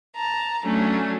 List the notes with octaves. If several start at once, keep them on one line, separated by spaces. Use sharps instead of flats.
A5 A#5
F#3 A3 C#4 D4